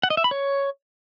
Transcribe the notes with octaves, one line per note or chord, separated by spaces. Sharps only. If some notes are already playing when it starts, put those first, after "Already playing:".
F#5
D#5
E5
B5
C#5